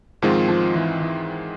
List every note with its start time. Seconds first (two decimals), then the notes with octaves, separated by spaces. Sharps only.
0.22 G#2 D#3 F3 G#3 C4 F4
0.48 F3
0.74 E3
1.01 E3